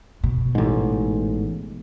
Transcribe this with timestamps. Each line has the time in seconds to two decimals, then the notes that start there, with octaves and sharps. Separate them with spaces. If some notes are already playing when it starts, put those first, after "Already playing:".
0.24 B2
0.55 A1 G#2